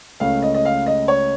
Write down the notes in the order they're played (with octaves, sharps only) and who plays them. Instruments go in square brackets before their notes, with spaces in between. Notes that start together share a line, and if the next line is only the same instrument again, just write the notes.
[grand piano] C#2 C#3 A3 C#4 F5
D#5
D#5
F5
D#5
C#5